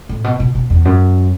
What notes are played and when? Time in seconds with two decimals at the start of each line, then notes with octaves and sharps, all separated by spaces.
0.09 A2
0.24 B2
0.40 B2
0.55 B2
0.70 E2
0.85 F#2